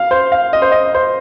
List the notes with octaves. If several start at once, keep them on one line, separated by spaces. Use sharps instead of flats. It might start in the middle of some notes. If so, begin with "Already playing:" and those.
Already playing: F5
C5
F5
D#5
C5
D#5
C5